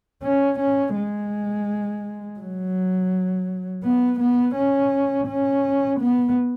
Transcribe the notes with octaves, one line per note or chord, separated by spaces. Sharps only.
C#4
C#4
G#3
F#3
B3
B3
C#4
C#4
B3